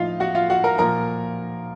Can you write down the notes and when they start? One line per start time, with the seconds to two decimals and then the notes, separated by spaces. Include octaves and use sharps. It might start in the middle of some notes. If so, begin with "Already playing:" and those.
Already playing: A2 F3 D#4 F4 F5
0.20 F#4 F#5
0.35 F4 F5
0.50 F#4 F#5
0.64 A#4 A#5
0.78 A#2 F3 A#4 A#5